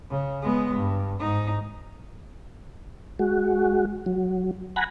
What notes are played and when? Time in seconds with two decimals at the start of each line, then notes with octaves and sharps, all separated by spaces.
0.10 C#3
0.42 G#3 B3
0.76 G2
1.19 G#2 D#4
3.19 G#3 F#4
4.06 F#3
4.76 F#5 G#5 A#5 B5